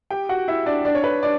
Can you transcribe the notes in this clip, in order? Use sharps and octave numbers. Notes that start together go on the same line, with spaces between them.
G4 G5
F#4 F#5
E4 E5
D4 D5
D4 D5
C#5
B4
D4 D5